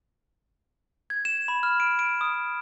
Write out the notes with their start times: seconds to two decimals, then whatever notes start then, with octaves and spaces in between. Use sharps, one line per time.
1.10 G#6
1.25 E7
1.48 B5
1.63 F6
1.80 D7
1.99 D7
2.21 D#6